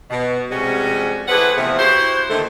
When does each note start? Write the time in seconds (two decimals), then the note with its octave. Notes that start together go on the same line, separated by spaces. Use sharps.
0.10 B2
0.50 F2 C3 G3 G#3 C#4 F#4
1.28 E3 A3 C4 G#4 B4 F#5
1.56 E2 C3 F3
1.79 E4 F#4 G4 C5
2.30 A#2 D3 D#3 A3